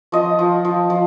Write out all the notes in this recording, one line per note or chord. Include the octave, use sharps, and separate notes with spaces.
F3 D#5
F3
F3
F3